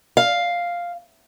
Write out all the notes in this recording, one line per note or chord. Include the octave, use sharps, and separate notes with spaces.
F5